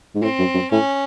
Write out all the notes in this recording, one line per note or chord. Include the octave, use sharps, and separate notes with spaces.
G#2
A2 C4
F#2
F#2
A2 C#4